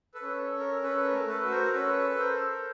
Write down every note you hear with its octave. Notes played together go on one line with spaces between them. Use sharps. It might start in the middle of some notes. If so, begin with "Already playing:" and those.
A4 B4
C#4
A4
C#4
A#4
C#4 A4 B4
A#4
A3
A4 B4
F#4
A#4 C5
C#4 A4 B4
A4
A#4 C5
A4